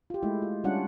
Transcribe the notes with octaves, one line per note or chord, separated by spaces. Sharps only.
F4 G4
G#3 A3 E4
F4
G3 C#4 D4 F4 F#5